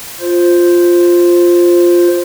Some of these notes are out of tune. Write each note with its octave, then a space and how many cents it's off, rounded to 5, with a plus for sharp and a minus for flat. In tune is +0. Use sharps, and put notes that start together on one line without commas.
F4 +0 C5 +0